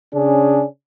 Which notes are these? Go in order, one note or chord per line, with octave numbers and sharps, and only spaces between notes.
C#3 C#4 D4 G#4